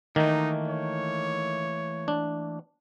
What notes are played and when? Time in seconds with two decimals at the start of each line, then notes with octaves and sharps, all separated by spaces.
0.16 D#3 E3 A3 A#3 D#4
0.68 C#5
2.08 D4